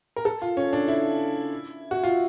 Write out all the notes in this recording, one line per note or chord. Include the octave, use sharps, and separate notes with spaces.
A#4
A4
F4
C#4
D4
E4
F#4
F4